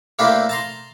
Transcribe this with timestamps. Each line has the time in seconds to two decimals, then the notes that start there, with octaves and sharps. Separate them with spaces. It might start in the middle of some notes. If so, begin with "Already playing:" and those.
0.19 A3 A#3 C4 D4 E4 G4
0.49 A5 A#5 C6